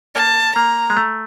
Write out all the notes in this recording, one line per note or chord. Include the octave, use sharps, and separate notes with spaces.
A#3 A5
A#3 A#5
G#3
A3